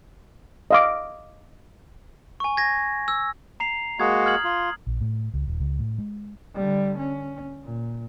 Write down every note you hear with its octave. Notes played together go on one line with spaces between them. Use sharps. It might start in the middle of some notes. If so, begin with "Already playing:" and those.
D#5 F5 D6
G#5 C#6
G#6 A#6
E6
A#5 C7 F7
G#3 A#3 F#4 D#6 G#6
F6 G#6 F#7
F4
A#1
A2
C#2
D#1
C#2
A2
G#3
D3 G3
C#4
A#2